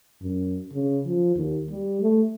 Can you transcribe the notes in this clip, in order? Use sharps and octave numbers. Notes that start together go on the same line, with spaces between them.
F#2
C#3
F3
D#2
G3
A3